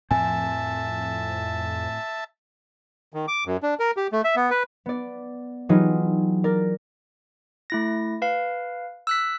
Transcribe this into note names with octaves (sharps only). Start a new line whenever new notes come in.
F2 A2 C4 E5 G#5 A5
D#3
D6
F#2
D4
A#4
G4
A3
E5
B3
B4
B3 D5
E3 F#3 D#4 F4 G4 G#4
A#4 D5
A3 E4 A#6
B4 F5
E6 F#6 B6